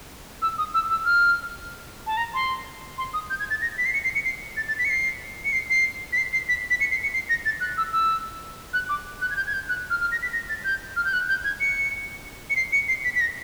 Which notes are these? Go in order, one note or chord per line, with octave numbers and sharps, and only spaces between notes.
E6
D#6
E6
E6
F6
A5
A#5
C6
C6
D#6
G6
G#6
A6
A#6
B6
C7
C#7
C7
C#7
C7
A6
A6
B6
C#7
C7
C#7
C7
C7
B6
C7
C7
B6
B6
C#7
C7
C#7
C7
A#6
A6
F#6
E6
E6
F#6
D6
F#6
G#6
G6
G#6
G6
F#6
F6
F6
A#6
B6
A#6
A6
G6
F6
G6
F#6
G6
G#6
C#7
C#7
C7
C#7
C7
B6
B6
A#6